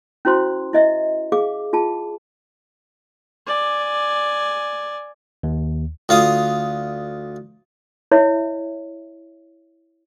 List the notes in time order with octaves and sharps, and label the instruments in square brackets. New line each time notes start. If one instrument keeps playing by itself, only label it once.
[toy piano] C#4 E4 F#4 C5 C6
E4 D#5 E5
G#4 F5 D6
F4 G#4 A5
[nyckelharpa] D5 G#5
[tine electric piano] D#2
[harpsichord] D2 F4 F5 D#6
[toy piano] E4 C#5 D#5 E5